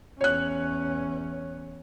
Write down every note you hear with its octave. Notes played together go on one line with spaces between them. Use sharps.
E2 C#4 C#5 F#6